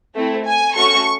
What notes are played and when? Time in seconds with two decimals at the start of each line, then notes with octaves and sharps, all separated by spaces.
0.15 A3 C4 E4
0.44 G#5
0.75 A3 C#4 F#4 A4 C#6